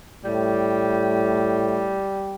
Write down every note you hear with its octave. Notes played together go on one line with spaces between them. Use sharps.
A2 G3